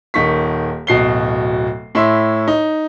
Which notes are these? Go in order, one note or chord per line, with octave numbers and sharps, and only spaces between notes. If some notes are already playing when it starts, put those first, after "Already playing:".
D#1 D#3 C#6 B6
D1 B2 C7 G7
A2 E4 E5 C6
D#4